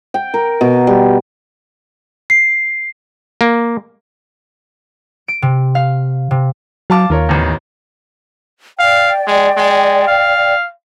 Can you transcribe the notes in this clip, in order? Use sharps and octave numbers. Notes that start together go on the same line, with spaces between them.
G5
A#4
B2
G3
C7
A#3
D7
C3
F5
C3
F#3 F5 A5 D6
D#2 F4 A#4 C#5
A1 E2 D#3
D5 F5 G5
G#3
G#3
F5